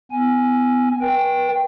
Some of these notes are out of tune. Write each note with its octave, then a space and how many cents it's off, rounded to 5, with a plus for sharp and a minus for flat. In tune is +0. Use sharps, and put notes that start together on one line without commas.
B3 +30 G#5 +0
B4 -40 G5 +0